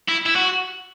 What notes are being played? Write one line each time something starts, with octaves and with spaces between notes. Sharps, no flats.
E4
E4
F#4